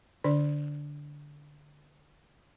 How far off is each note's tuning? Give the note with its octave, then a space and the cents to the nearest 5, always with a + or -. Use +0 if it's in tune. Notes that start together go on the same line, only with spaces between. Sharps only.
D3 +0 D4 -15 D5 +0